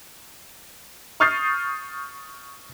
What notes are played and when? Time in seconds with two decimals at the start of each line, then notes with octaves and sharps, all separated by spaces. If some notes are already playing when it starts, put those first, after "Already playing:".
1.20 C#6 D#6 F6 G6 A6 C7